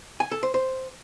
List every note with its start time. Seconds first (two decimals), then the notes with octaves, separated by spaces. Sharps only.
0.20 G#5
0.31 A4
0.43 C5
0.54 C5